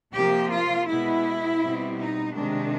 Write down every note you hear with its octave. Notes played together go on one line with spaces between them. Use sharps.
C3 F3 A#3 G4
F4
B2 G#3 B3 E4
B2 G3 C4
D#4
C3 D#3 G#3 D4